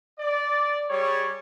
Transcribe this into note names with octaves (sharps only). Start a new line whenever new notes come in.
D5
G3 G#4 C#5